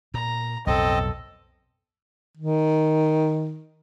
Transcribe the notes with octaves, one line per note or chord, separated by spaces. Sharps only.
A#2 A#5
B1 F2 A2 C4 A4 D#5
D#3